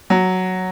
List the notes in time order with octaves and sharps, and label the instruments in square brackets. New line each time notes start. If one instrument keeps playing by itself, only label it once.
[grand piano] F#3